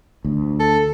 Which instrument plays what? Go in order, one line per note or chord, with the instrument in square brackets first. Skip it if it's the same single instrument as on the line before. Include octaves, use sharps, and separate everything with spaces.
[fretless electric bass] D2
[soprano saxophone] A4